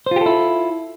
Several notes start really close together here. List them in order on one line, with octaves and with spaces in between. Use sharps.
C5 F4 G4 A4 E4